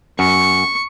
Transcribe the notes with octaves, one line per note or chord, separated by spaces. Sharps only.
F#2 C#6